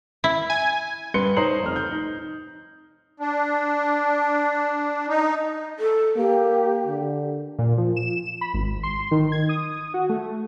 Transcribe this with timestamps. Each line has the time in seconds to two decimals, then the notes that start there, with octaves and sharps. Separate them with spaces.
0.24 E4
0.50 G#5
1.14 G2 B4 C6 C#7 G7
1.37 D#4 C5 C#5 A#5 C7 F#7
1.63 F1 F6
1.76 G6
1.91 D#4
3.20 D4
5.08 D#4
5.79 A4
6.17 A#3 G4
6.87 D3
7.59 A#2
7.78 F3
7.96 E7
8.41 B5
8.54 G#1
8.83 C6
9.11 D#3
9.32 G#6
9.49 D#6
9.94 F#4
10.09 A3